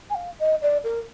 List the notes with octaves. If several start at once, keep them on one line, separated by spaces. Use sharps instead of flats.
G#5
F5
D#5
D5
A#4